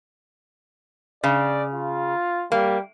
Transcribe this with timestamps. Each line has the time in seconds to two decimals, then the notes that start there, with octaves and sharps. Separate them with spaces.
1.24 C#3 D5
1.74 F4
2.52 G3 A#3